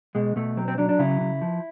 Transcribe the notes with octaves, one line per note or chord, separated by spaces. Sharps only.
B2 G#3
B2 A3
F#3 C4
C4
F#3 D4
D4
C#3 E4
C#3
F3